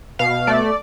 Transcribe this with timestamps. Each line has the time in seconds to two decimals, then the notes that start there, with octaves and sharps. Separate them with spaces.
0.19 B2 F5
0.47 A3 D5